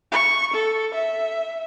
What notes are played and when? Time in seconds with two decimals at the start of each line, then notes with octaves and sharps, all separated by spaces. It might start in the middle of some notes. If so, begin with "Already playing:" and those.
0.12 C#6
0.53 A4
0.94 E5